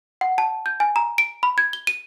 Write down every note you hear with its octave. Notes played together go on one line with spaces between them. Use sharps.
F#5
A5
G6
G#5
A#5
D7
B5
G#6
G7
D#7